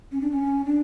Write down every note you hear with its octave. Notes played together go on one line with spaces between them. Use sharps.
C#4
D4
C#4
D4